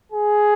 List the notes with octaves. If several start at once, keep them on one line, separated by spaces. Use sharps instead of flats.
G#4